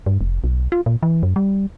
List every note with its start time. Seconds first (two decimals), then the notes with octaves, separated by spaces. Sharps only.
0.06 G2
0.21 F1
0.44 B1
0.72 F4
0.86 A#2
1.03 E3
1.23 F#2
1.36 G3